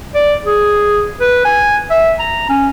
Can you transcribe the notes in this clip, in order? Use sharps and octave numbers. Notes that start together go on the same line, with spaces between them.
D5
G#4
B4
G#5
E5
A#5
C#4